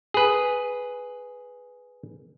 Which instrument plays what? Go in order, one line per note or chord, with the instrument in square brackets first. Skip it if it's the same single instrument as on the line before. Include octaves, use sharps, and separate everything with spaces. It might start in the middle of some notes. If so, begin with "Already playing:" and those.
[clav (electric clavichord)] G#4 B4